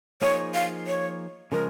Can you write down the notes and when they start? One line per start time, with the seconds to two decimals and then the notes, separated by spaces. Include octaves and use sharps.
0.21 F3 A#3 D#4 G#4 C#5
0.54 F5
0.87 C#5
1.52 C#3 F3 G#3 A#4